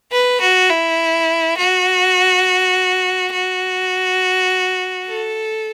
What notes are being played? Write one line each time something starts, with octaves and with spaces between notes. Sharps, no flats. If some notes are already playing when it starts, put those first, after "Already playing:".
B4
F#4
E4
F#4
F#4
A4